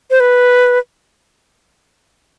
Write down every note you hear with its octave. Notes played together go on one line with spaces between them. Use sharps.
C5
B4